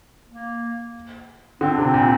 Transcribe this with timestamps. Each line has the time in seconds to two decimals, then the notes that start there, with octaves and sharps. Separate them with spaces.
0.29 A#3
1.61 D3 C4
1.73 D4
1.78 C3
1.85 C4
1.94 A#2